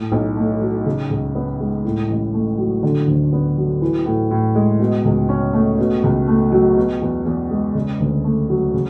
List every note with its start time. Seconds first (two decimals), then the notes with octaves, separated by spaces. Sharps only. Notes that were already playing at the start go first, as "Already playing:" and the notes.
Already playing: A2
0.12 B1
0.37 A3
0.61 F#3
0.86 C#3
1.10 C#2
1.35 B3
1.60 G#3
1.85 A2
2.09 A1
2.34 A3
2.58 F#3
2.83 D3
3.08 D2
3.33 B3
3.57 F#3
3.81 E3
4.05 A2
4.31 A2
4.55 G#3
4.80 B2
5.05 C#2
5.29 C#4
5.53 A3
5.79 B2
6.04 C#2
6.28 A3
6.52 F#3
6.76 B2
7.01 E2
7.26 E2
7.50 G#3
7.75 C#3
8.00 D2
8.24 A3
8.50 F#3
8.74 C#3